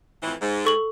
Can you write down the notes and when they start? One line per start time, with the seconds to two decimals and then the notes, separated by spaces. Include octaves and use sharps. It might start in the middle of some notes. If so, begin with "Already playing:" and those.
0.23 F2 A2 E3
0.42 G#2
0.65 A4 C#6 F#7